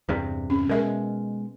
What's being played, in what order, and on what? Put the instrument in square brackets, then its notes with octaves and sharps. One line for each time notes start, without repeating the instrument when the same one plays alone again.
[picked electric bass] E2 G2 C3
[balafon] C#4
[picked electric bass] B2 G#3 [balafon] A#4 E5